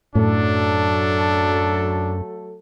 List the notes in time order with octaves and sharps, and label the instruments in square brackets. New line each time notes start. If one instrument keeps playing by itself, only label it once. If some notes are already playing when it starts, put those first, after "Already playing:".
[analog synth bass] F#2 [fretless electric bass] A2 [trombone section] F#3 A3 A4 [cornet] D4